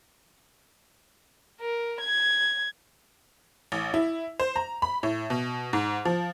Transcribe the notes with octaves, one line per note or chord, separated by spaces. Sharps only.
A#4
G#6
A1
E4
C5
A#5
B5
A2
B2
G#2
F3